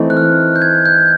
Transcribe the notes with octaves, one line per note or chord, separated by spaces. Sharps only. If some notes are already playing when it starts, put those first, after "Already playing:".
Already playing: E3 A3 C4 D#4
F#6
F6
G6
G#6
G6